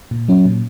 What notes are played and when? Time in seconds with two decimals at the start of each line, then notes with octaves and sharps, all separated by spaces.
0.11 A#2
0.28 F#3 C#4
0.45 A#2